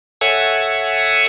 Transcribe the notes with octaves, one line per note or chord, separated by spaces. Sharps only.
A4 C#5 E5 F#5 G#5